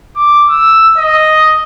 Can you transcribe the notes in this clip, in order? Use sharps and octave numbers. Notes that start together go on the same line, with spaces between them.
D6
E6
D#5